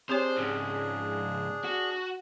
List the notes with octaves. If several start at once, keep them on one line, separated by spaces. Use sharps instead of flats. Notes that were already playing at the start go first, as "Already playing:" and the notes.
C4 D4 G4 G#4 C5 C#5
G#2 C#3
F#4